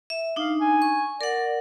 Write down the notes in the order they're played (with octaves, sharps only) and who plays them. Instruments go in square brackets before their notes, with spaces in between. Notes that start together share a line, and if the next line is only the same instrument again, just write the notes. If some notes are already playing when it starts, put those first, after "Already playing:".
[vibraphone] E5
[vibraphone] D4 D#4 [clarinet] F5
[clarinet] G#5
[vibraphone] C#6
[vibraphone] A#4 F#5 [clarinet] D5